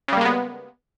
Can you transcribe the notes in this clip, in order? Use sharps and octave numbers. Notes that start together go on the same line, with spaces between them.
C#3 G3 G#3 A#3 B3